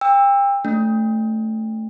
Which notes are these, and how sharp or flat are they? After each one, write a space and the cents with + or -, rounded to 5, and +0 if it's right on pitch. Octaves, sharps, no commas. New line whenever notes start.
G5 +35 E6 +0
A3 +0 C#4 +45